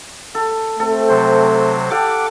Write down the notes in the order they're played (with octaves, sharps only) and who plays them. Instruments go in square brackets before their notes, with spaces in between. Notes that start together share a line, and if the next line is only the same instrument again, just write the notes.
[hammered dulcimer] A4
[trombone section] A3 C4 [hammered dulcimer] A4
[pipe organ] C3 F#3 C5
[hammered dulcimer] G4 A4 F5 [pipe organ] F#5 D6